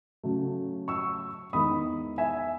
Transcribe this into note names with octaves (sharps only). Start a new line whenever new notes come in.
C#3 F#3 A3
C#6 E6
E2 D#3 G#3 B5 D#6
E5 G#5